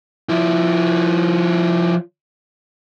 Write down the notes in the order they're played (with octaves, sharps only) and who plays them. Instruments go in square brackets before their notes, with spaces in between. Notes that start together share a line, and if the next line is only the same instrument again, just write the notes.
[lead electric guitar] F3 E4